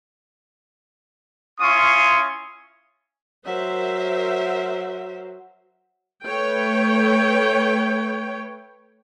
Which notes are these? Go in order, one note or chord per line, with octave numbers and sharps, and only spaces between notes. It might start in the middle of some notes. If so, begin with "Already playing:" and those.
C#4 E4 F4 C6 C#6 D#6
F#3 A#4 C5 E5
A3 B4 C#5 G5